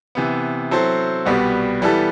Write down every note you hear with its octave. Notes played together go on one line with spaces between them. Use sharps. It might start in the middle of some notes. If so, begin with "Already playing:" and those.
C3 E3 B3
F#3 C4 E4 A4 C5
C2 B2 G3 B3 F#4
E3 G3 B3 E4 A4